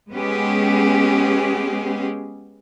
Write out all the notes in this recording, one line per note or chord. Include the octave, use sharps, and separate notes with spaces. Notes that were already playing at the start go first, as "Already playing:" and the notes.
G#3 B3 C#4 G4 G#4